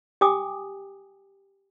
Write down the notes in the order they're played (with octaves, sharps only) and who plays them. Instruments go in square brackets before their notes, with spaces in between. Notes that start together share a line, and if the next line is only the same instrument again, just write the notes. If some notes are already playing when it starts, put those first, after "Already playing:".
[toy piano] G4 G5 G#5 D6 D#6